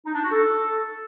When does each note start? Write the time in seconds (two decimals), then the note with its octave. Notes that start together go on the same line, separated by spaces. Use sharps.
0.06 D#4
0.14 D4
0.23 F#4
0.31 A4